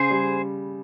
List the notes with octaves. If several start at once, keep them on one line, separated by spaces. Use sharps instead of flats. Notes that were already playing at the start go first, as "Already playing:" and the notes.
Already playing: C#3 G#4 C5
G3